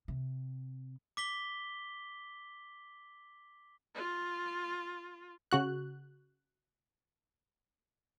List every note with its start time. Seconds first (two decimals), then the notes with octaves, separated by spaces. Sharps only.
0.08 C3
1.17 D6 B6 G7
3.95 F4
5.52 C#3 F#4 F#6